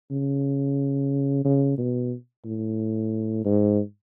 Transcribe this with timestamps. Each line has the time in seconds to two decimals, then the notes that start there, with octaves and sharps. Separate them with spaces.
0.11 C#3
1.45 C#3
1.78 B2
2.45 A2
3.45 G#2